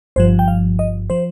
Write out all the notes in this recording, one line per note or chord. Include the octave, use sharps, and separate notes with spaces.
G1 G2 F3 C5
G5
F5
D#5
F3 C5